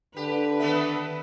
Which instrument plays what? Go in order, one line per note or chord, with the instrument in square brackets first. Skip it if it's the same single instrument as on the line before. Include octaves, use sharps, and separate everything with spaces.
[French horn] D3 [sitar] G4 [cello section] B4
[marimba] D#3 E5 [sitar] A#3 B3 A4